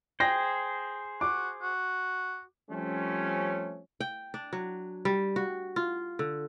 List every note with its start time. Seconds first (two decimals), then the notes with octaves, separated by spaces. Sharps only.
0.20 G#4 C5 G5 A#6
1.21 F#4 D6
1.62 F#4
2.70 F3 G3 A3 C4 C#4
4.00 G5
4.34 D4
4.53 F#3
5.05 G3
5.36 F#4
5.76 F4
6.19 D3